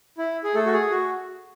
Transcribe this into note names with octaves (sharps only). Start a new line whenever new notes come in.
E4
G#4
A3 A4
F#4
G#4
F#4